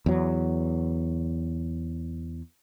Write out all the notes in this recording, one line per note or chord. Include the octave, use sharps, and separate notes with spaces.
E2 F#3